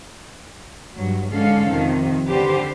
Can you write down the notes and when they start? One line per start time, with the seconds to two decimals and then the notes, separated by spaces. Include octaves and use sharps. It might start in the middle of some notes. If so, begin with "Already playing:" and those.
0.96 G2 F#3
1.32 G#2 D3 G#3 C#4 A4 F5
1.68 F2 C3 D#3 F3
2.27 D3 G4 B4 C5